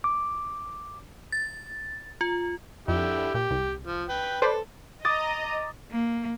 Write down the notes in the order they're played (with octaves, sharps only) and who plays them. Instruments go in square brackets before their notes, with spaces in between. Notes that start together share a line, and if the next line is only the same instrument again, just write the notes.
[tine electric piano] D6
[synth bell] A6
F4
[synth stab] F2 [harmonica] D3 E4 G4
[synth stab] A#2 [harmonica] G4
[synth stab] C2
[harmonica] F3
B4 G5
[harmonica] A4 [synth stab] B4 C5 D5
[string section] D#5 A#5 [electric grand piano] D6 D#6 A6
[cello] A#3